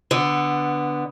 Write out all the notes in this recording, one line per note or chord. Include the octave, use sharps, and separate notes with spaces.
D3 B3